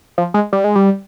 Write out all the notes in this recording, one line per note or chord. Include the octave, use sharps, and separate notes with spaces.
F3
G#3
G3
G#3
G3